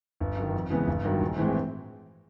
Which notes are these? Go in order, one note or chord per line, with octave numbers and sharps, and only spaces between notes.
G1
F#2
D#3
F2
C#3 E3 G#3 B3
G1
G2 D#3 F#3
A#1
A2 E3 G#3 C4